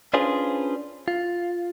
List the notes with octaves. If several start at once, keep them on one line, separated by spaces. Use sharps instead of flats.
C#4 D4 F4 G#4 B4 C5
F4